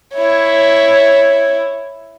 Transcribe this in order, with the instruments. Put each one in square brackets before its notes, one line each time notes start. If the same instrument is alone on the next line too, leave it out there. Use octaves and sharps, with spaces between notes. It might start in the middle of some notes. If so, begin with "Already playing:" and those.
[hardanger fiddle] E4 C#5